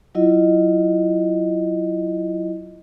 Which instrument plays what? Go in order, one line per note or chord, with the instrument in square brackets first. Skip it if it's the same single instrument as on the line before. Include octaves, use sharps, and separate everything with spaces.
[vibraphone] F#3 E4 F4 D#5